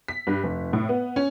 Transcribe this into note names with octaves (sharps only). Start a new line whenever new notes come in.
B6
G2
F1
A2
B3
C#4